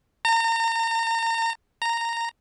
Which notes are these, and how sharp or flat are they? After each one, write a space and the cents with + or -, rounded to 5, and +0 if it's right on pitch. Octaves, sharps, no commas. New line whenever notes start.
A#5 -35
A#5 -10